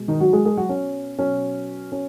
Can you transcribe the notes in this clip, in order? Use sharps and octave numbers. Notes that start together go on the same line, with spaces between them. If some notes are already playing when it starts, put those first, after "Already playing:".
Already playing: B2 G#3
D#3 D#4
F#3 F#4
G#3 G#4
G#3 G#4
F#3 F#4
C#4
B2 F#3 C#4
C#4